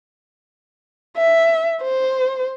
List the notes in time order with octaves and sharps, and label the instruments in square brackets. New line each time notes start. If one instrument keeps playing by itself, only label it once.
[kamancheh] E5
C5